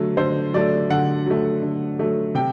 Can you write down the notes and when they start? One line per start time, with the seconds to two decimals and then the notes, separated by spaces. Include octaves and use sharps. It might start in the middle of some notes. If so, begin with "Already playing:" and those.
Already playing: D3 F#3 A3
0.17 D3 C5
0.54 F#3 A3 D5
0.90 D3 F#5
1.26 F#3 A3
1.62 D3
1.99 F#3 A3
2.35 C3 G5